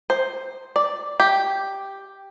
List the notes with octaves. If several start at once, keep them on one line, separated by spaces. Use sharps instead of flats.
C5
D5
G4